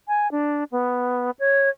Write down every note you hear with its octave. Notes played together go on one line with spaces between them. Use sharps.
G#5
D4
B3
C#5